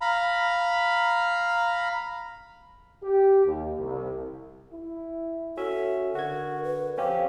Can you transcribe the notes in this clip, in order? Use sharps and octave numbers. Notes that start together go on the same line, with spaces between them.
F5 A#5 B5
G4
D#2
C2
E4
C#4 F#4 A4 E5
D3 F#4 A#4 G#6
B4
F2 C4 C#4 G4 F5